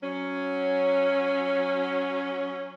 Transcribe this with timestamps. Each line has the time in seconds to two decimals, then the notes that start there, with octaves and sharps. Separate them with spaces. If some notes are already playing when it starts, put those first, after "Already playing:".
0.03 F#3 C#4